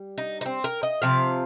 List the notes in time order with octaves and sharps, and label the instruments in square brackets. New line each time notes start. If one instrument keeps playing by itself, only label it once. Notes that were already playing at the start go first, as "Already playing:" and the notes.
Already playing: [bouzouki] G3
D#4
D#4
C4
A#4
D#5
C3 F3 F5